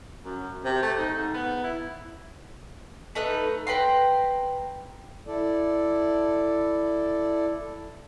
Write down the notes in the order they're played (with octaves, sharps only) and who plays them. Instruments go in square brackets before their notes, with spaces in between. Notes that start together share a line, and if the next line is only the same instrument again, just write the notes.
[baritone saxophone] F#2
C3
A3
D#4
G#2
B3
E4
[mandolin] A3 D#4 B4 F#6
B4 G5 A#5 C6
[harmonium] E4 A4 D5